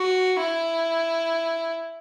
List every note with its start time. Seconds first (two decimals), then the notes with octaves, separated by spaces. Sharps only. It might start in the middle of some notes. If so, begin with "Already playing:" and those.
Already playing: F#4
0.40 E4